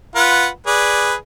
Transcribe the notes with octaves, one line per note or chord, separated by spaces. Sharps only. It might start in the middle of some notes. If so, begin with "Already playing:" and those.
F4 B4 F#5
G#4 B4 D5